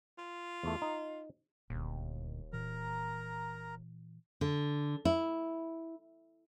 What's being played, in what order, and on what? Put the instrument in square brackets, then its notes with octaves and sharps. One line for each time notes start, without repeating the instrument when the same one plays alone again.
[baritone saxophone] F4
[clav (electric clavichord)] E2 A3
D#4
[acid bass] D#1 [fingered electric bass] D2 A#2
[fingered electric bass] A#2 E3 [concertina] A#4 A#5
[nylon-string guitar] D3
E4